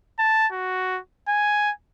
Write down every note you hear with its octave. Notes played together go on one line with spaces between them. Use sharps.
A5
F#4
G#5